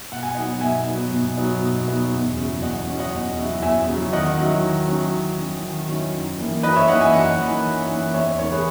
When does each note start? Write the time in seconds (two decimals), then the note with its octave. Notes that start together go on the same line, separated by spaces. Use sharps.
0.12 B2 F#5
0.23 G#5
0.34 F#3 B3 D#4 D#5 F#5
0.61 B2 E5 G#5
0.87 F#3 B3 D#4
1.12 B2
1.37 F#3 B3 D#4
1.62 B2
1.87 F#3 B3 D#4
2.12 E2
2.37 C#3 F#3 C#4 E4
2.62 E2 D#5 F#5
2.87 C#3 F#3 C#4 E4
2.99 D#5 F#5
3.13 E2
3.37 C#3 F#3 C#4 E4
3.62 E2 E5 G#5
3.88 C#3 F#3 C#4 E4
4.12 D#3 D#5 F#5
4.38 F#3 C#4 E4
4.63 D#3
4.88 F#3 C#4 E4
5.13 D#3
5.38 F#3 C#4 E4
5.63 D#3
5.88 F#3 C#4 E4
6.13 F#2
6.38 E3 A#3 D#4
6.63 F#2 B4 D#5
6.76 C#5 E5
6.88 E3 A#3 D#4 D#5 F#5
7.01 E5 G#5
7.13 F#2 D#5 F#5
7.38 E3 A#3 D#4
7.64 F#2
7.89 E3 A#3 D#4
8.14 E2 C#5 E5
8.26 C#5 E5
8.39 C#3 E3 G#3 D#4 A#4 C#5
8.51 G#4 B4